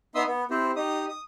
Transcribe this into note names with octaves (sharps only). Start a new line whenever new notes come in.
B3 D#4 E5 C6 D#6 E6
B3
C4 E4 G4 C5
D#4 G4 D#6
D#6